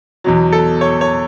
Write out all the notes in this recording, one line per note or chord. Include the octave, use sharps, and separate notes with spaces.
E2 B2 F#3
A4
C#5
C#5